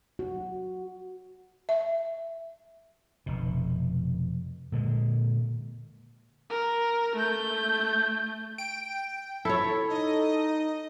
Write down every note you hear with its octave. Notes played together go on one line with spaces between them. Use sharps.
F#4
E5
F1 B2
A#2 D3 G#3
A#4
A3 G6
G5 D7
E4 A4 C#5
D#4 D#5